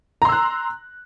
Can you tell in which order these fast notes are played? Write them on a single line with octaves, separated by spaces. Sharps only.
A#5 C6 E6 F#6